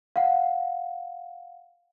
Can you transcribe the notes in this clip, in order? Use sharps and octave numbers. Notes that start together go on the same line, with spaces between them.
F5 F#5